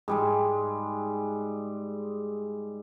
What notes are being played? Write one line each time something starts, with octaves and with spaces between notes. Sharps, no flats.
G#2 G3 G#3